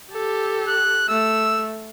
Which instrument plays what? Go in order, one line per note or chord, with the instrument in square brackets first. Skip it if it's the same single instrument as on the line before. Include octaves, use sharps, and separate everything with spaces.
[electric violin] G4 A4
[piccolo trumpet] F#6
[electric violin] A3 [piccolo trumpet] E6